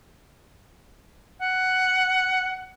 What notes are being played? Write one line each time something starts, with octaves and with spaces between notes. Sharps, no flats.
F#5